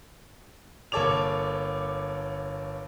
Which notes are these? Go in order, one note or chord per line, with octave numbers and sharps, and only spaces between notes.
G1 A#3 A4 C#5 D6 F7